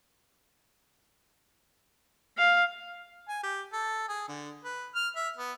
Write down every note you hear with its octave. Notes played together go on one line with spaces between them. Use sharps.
F5
G#5
G4
A4
G#4
D3
B4
F6
E5
B3